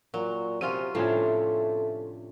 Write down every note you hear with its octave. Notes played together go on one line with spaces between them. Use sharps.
A#2 F#3
C3 F#3 C#4 F4 D#7
A2 C3 F3 A3 C#4 D4 F4